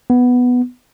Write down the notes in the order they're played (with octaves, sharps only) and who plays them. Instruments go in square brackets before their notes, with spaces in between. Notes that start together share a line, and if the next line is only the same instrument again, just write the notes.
[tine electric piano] B3